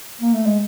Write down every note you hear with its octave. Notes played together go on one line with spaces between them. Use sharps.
A#3
A3
G#3